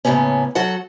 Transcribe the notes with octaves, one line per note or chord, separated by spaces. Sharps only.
A2 C#3 F#3 A#3 B3 C#4
F#3 F#4 A4 F#5